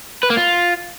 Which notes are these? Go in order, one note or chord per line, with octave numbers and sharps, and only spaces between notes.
B4
A#3
F4